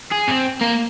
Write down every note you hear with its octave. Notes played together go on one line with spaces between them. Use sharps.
G#4
C4
A#3